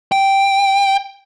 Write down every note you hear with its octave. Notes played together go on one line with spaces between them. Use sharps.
G5